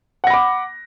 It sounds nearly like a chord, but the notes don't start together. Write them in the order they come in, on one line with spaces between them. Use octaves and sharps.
F#5 A#6 B5 D6